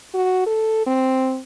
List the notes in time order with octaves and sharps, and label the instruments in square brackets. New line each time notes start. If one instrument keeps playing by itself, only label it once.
[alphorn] F#4
A4
C4